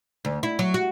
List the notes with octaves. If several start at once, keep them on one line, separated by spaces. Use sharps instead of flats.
D2
E4
F#3
F#4